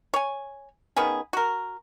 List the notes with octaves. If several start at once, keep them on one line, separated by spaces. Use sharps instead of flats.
C#5 G#5
D#3 B3 C#4 G#4
F#4 A#4